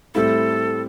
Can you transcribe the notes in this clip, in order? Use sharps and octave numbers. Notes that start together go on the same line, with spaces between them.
A2 G3 C4 E4 A4